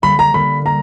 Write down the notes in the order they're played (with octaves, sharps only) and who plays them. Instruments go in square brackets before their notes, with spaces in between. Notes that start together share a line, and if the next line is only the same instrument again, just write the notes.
[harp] D3 G3 A#3 [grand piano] B5
[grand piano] A#5
[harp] D3 G3 A#3 [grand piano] B5
[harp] A#3 [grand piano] A#5